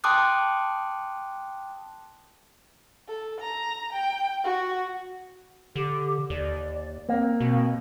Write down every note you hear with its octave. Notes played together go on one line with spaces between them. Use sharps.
G5 A5 C6 D6 D#6 F#6
A4
A#5
G5
F#4
D3 G4
D#2 D5
A#3 C4
B2 C4